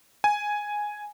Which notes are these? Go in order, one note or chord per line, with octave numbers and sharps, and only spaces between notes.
G#5